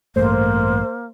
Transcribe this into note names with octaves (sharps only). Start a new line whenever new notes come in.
A1 G2 A3 A#3 C5